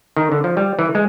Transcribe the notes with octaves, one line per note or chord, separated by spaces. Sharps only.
D#3
D3
F3
G3
E3
G#3